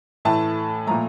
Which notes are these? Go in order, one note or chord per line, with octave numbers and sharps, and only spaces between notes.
A2 E3 A3 A5
A#2 F3 A3 A#5